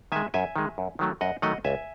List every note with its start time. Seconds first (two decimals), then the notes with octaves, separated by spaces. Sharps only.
0.12 D#3 G#3 E5 G#5
0.34 F#2 E5 G#5
0.56 D#3 G#3
0.78 F#2
0.99 D#3 F#3 A3
1.21 F#2 D#5 F#5
1.42 D#3 F#3 A3 D#5 F#5
1.65 C#2 E5 G#5